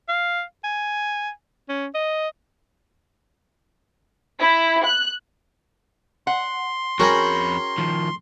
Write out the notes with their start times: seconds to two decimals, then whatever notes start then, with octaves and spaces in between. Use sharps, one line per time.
0.08 F5
0.64 G#5
1.69 C#4
1.94 D#5
4.39 E4
4.84 F#6
6.27 F#5 C6
6.99 F2 C#4 F#4 G#4 A#4 G5 B5
7.78 D#3 F3